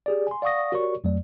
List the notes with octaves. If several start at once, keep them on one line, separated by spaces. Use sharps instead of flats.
G4 G#4 D5
G#5 C6
D5 F5 F#5 C#6 D#6 A#6
F#4 G4 A#4 C#5 D5 C#6
F2 F#3 A3 D5